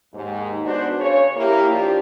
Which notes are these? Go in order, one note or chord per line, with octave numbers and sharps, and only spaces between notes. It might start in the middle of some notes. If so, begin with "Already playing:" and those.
D#2 G#2
B3 D4 F#4 C5
C#3 C#5
A#3 E4 G4
F3 D4 F4 G4